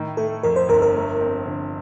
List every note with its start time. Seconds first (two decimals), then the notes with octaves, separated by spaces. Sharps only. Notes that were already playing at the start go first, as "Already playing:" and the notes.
Already playing: A2 D#3
0.17 A3 A4
0.43 F2 A#4
0.56 C5
0.69 G1 A#4
0.82 A#4
0.94 A3
1.21 C4
1.46 D3